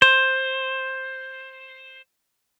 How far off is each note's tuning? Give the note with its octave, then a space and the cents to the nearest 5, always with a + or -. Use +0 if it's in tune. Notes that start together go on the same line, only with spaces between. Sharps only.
C5 +10